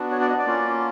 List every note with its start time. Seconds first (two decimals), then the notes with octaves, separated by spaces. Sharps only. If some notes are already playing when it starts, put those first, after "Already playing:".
Already playing: B3 D4 F#4
0.12 C#5
0.21 D5
0.29 D#5
0.38 D5
0.46 A#3 C#4 F4